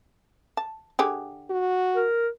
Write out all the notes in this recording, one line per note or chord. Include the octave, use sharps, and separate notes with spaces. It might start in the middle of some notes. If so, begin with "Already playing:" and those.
A5
D3 G4 G#4
F#4
A#4